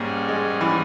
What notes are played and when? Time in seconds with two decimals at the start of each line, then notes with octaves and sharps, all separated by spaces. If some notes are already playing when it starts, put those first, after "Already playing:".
Already playing: G#2 G3 A#3 C#4 G#4
0.28 G#3
0.61 E3